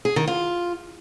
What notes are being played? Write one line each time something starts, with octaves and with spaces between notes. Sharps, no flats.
G#4
D#3
F4